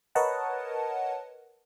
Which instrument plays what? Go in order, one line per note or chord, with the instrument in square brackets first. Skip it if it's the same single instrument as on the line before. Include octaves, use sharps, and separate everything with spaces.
[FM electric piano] A#4 B4 C#5 D#5 F#5 A5